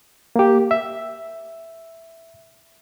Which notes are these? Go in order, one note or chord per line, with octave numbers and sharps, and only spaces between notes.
A#3 G4
E5